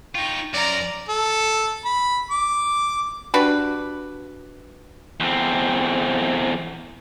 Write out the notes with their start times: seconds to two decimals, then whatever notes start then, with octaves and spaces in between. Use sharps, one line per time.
0.15 D#4 F4 G5 C#6
0.53 F#2 A#4 D5 A#5
1.09 A4
1.85 B5
2.31 D6
3.34 D4 F#4 G4 B4
5.20 E2 C4